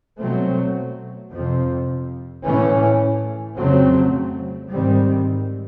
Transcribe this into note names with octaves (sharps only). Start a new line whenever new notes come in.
B2 F#3 A3 C4
F2 C3 F3
A2 E3 A3 C#4
F2 C#3 F#3 A3 C4
G#2 D#3 G3 C4